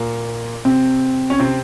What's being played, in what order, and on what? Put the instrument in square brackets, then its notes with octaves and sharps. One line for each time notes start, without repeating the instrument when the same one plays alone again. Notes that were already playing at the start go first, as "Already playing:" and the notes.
Already playing: [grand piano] A#2 A#3
C3 C4
C#4
C3 C4